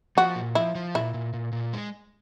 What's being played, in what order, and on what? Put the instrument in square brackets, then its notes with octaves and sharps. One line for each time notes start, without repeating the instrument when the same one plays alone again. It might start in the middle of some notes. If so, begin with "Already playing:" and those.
[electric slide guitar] F3 [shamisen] F#4
[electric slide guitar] A#2
[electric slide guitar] F3 [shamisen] E4
[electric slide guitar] F3
[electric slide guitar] A#2 [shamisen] E4
[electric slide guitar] A#2
A#2
A#2
G#3